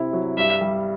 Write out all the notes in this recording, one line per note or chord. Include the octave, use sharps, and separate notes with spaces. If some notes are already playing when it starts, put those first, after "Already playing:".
Already playing: C3 C4 E4
F#3
G2 E5
G3